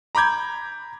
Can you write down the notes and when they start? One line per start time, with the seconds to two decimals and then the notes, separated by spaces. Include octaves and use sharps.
0.15 A#5 B5 D6 G6 G#6